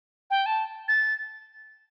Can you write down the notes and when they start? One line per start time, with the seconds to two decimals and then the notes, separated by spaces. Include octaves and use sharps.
0.30 G5
0.46 A5
0.88 A6